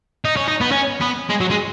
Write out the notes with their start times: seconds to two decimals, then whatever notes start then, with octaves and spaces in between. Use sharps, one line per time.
0.25 D#4
0.36 C#4
0.48 D#4
0.61 B3
0.72 C#4
1.01 B3
1.29 G#3
1.40 F#3
1.50 G#3